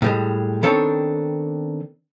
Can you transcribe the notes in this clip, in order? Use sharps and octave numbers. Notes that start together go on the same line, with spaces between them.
A2 G3 G#3
D#3 B3 C4 D4 A4 C#5